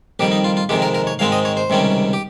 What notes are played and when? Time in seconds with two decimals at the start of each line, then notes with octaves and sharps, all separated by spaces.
0.19 F2 D#3 G3 G4
0.32 D#4
0.44 F4
0.57 F4
0.69 F2 C3 D#3 G#3 G4
0.82 A#4
0.95 A#4
1.07 C#5
1.19 G#2 D#3 G#3 C4 F5
1.32 D#5
1.45 C#5
1.57 C5
1.70 C#2 C3 D#3 G3 C#4
2.13 G4